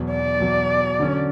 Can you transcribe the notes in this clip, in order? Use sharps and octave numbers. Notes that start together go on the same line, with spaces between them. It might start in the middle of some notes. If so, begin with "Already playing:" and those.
Already playing: E2 B2 F#3
D5
E2 B2 F#3
D3 F#3 C#4